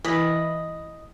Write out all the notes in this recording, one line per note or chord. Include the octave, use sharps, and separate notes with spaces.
E3 D#5 B5